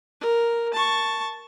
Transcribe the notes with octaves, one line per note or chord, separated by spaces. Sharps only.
A#4
A5 C#6